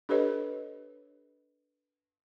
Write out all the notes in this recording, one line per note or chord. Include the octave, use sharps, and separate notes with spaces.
D4 G4 A4 B4 C#5 D#5